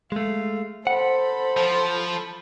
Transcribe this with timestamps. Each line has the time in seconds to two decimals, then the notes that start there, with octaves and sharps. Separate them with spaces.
0.12 G#3 A3 F5
0.87 A4 C5 F#5 B5
1.57 F3